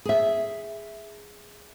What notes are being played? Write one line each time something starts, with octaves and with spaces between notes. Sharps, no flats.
G#4 E5